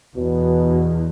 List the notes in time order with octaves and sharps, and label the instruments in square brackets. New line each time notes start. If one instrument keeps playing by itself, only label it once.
[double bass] E2 [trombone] B2